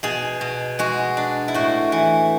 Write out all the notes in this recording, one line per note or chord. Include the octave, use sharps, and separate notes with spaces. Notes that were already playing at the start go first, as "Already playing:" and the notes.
B2 G#4
B2
G#3 F#4
D4
E4
A2 F#4
E3